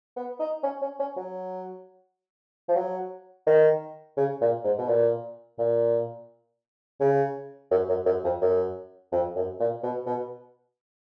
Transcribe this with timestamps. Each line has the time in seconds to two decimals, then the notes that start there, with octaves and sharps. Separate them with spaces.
0.17 B3
0.40 D#4
0.64 C#4
0.82 C#4
0.99 C#4
1.17 F#3
2.69 F3
2.76 F#3
3.47 D#3
4.17 C#3
4.41 A#2
4.64 G#2
4.78 B2
4.88 A#2
5.59 A#2
7.01 C#3
7.71 F#2
7.89 F#2
8.06 F#2
8.24 F2
8.42 F#2
9.12 F2
9.36 F#2
9.60 A#2
9.83 B2
10.06 B2